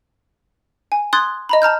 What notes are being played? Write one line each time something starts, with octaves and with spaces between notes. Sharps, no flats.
G#5
C6 D#6 F#6 G#6 A6
D#5 A#5 B5
A5 A#5 F6 G6